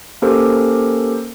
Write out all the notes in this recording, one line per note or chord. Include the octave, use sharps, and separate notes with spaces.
A#3 C#4 G4 A4 A#4 C5